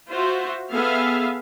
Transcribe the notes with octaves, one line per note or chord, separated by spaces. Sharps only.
F4 F#4 C5 E5
B3 G#4 A4 E5 F5